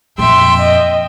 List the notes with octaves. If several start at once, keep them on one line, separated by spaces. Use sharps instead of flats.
F2 A#2 E5 G5 C6
D#5